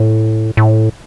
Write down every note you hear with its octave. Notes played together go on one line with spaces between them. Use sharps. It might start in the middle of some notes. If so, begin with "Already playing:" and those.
Already playing: A2
A2